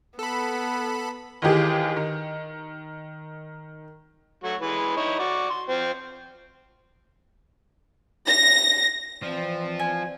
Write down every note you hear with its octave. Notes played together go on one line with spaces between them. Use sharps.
B3 A4 B5
D#2 D#3 E3 G4 G#4
D#3
F#3 A3 F#4
E3 G#3 B4
D#4 E4 C#5
F#4 D5
C6
F3 C4
A#6
E3 F3 C4 D5
G#5